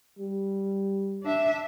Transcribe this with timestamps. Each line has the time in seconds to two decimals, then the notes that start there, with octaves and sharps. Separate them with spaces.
0.19 G3
1.23 D4 E5